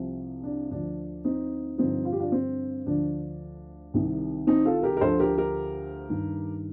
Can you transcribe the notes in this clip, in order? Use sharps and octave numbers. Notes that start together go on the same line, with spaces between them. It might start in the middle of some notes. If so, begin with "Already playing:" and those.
Already playing: C2 C3 F3
D4
D2 D3 F3 D4
C4 D#4
G2 D3 F3 C4 D#4
F4
G4
D4 F4
C4
D2 D3 F3 D4
C2 C3 D#3
C4 D#4
F4 A4
G4 A#4
A#4
D2 D3 F3 A4 C5
G4 A#4
G4 A#4
G2 D#3